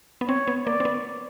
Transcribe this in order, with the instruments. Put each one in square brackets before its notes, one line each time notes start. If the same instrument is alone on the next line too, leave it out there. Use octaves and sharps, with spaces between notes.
[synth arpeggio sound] B3
[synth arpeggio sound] C4 [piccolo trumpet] C#5
[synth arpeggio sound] B3
[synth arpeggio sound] A#3 [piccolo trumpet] D5
[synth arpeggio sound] C4
B3